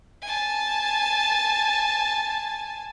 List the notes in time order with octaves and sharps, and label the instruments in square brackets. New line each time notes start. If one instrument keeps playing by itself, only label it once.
[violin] G#5 A5